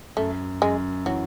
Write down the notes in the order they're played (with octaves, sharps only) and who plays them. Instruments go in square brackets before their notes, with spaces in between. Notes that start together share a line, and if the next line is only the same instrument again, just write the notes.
[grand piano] F#2 [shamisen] A3
[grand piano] F#2 [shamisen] G#3
[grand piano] E3 [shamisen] F#3